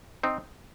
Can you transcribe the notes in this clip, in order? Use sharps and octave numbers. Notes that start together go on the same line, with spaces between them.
C4 D#4